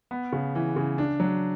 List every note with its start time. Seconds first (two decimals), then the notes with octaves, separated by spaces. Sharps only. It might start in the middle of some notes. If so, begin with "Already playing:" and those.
0.11 B3
0.33 C#3
0.55 E3
0.76 C#3
0.98 D4
1.20 F#3